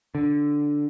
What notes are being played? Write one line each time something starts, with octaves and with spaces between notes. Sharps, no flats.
D3